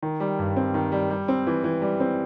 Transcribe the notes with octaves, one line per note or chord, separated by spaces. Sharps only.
D#3
G3
G2
C4
D#3
G3
G3
C4
E3
E3
G3
C4